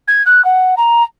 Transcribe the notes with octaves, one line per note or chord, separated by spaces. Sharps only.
G#6
F#6
F#5
A#5